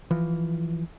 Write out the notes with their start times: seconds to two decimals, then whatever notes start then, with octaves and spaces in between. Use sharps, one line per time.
0.11 E3 F3